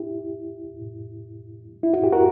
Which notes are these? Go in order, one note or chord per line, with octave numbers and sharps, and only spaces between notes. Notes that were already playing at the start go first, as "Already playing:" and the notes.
Already playing: E4 G4
E4
F#4
G4
F#4 A#4